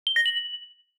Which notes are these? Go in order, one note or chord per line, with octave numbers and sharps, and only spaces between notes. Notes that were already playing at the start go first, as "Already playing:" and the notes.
G7
A#6
F#7